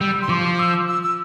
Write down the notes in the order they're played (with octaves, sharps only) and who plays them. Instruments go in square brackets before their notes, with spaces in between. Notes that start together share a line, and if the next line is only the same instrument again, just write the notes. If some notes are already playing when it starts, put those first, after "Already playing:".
[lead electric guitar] G3 [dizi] E6
[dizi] C6
[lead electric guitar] F3 [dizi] D6
[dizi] E6
E6
E6